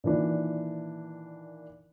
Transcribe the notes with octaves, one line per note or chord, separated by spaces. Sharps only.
A#2 D#3 E3 D4